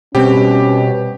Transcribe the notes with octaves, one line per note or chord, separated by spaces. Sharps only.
B2 G3 C4 C#4 G4